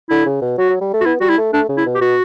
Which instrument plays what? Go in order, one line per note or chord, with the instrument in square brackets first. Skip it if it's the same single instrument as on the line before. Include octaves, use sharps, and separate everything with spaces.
[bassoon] D3 [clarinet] E4
[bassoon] C#3
B2
[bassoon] F#3 [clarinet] F#4
[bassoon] F#3
G3
A3
[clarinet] F#4
[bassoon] B3 [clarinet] E4
[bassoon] G3 [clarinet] F#4
[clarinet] E4
[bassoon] A3
[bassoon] A3 [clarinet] D4
[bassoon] C#3
[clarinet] E4
[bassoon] B2
[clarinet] G4
[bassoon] B2 [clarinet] F#4